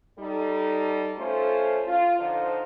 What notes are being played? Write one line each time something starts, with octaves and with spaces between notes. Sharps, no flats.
G3 D#4 A4
A3 C#4 F4 A4 C5
F4
D3 F3 D#4 F4 C5